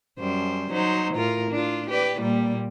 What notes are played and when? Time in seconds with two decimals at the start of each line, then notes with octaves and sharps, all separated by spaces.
0.19 F#2 G3 C5
0.71 F#3 D#4 C5
1.14 A2 F4 A#4
1.51 D4 F4
1.90 G4 B4 D5
2.20 A#2 G3 A#3